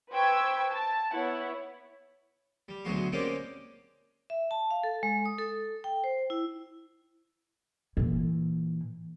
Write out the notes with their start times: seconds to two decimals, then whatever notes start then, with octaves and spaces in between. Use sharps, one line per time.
0.11 B4 C5 G5 C#6 E6 G#6
0.71 A5
1.12 B3 E4 C#5 F#5
2.68 G3
2.85 D2 B2 F#3 G#3 F#4 C6
3.12 G#3 A#3 C4 C#4 G4 D5
4.30 E5
4.51 A5
4.71 F5
4.83 A4
5.03 G#3
5.25 D#6
5.39 A4
5.84 G5
6.04 C5
6.30 E4
7.97 A#2 E3